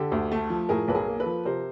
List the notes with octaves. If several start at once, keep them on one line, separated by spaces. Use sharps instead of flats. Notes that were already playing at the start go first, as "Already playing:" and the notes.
Already playing: D3 G4 A4
D2
A3
F3
A2 G#4 A#4
B1 B4
G#4 A#4
A#3
A4 B4
F3
C3 A#4 C5